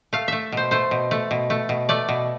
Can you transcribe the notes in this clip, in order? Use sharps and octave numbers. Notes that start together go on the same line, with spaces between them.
A3 F5
A3 E5
B2 C5
A3 C5
B2
A3
B2
A3
B2
A3 D5
B2